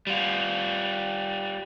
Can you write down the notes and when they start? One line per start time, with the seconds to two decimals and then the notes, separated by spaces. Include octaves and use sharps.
0.07 G3 F4